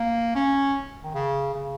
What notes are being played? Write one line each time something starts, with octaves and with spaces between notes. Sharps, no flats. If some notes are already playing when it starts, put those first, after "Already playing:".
Already playing: A#3
C#4
D#3
C#3
C#3